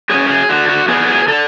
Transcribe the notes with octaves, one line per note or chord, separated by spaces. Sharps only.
F#3 C#4 G#4
G#4
D3 F#4
F#4
F#3 B3 G#4
G#4
D3 A4